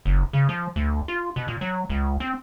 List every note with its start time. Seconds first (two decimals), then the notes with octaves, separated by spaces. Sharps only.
0.06 F#1
0.33 C#3
0.49 F3
0.76 D2
1.08 F4
1.36 B2
1.48 A#2
1.61 F#3
1.90 C#2
2.20 C4